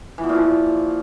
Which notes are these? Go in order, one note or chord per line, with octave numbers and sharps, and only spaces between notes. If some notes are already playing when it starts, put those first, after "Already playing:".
E3
B2
A#2
F3